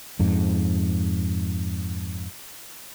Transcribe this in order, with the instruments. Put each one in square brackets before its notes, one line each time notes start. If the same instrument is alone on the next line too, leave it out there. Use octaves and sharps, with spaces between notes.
[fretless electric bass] F2 G#2